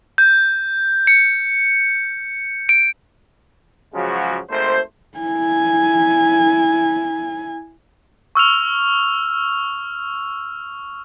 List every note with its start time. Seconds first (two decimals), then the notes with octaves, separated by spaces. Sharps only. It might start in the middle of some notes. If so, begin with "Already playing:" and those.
0.18 G6
1.07 C#7
2.69 D7
3.94 C#3 F3 F#3 G#3 F#4
4.50 G#1 A3 C5
5.18 E4 G#5
8.35 C#6 E6 F6 F7